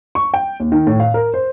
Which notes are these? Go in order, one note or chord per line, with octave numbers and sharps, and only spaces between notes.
C#6
G5
D#2
D#3
A2
F5
A#4
C5